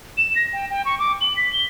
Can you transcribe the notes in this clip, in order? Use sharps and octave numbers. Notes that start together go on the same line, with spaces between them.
E7
A#6
G5
G5
C#6
D6
F#7
B6
G7